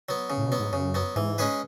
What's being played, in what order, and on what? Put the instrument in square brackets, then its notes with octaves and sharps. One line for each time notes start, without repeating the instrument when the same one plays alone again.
[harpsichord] F#3 B3
C#3
[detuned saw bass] A2
B2
[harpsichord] F#3 B3
[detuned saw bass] G#2
[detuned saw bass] F#2 [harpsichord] C#3
[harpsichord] F#3 B3
[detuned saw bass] G#2 [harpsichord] E3
[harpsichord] G#3 C#4 G#4 B4